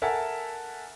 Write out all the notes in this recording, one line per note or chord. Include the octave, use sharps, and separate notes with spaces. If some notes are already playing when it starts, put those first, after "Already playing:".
A4 A#4 E5 F#5 G#5 A5